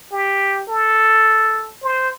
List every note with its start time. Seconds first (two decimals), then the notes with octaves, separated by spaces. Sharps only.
0.12 G4
0.69 A4
1.83 C5